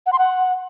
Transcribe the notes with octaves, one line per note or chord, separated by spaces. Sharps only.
F#5
C6
F#5